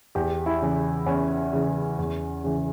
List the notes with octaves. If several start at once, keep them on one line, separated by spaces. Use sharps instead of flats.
E2 G4
E4
C#3 E3
E2 C#4
C#3 E3
E2
C#3 E3